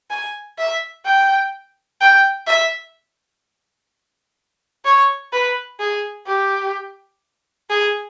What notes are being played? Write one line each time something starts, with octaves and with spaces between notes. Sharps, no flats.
G#5
E5
G5
G5
E5
C#5
B4
G#4
G4
G#4